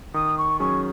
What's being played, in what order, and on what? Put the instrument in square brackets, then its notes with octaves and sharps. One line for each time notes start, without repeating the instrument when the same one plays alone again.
[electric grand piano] D#3 [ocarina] D#6
[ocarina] C#6
[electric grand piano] F#3 C#4 G#4 [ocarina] C#6